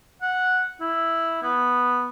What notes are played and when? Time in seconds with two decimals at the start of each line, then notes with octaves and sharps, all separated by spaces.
0.22 F#5
0.81 E4
1.42 B3